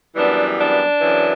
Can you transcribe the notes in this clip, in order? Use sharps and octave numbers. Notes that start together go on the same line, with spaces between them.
F#2 E3 G3 B3 D4
D4
F#2 C#3 E3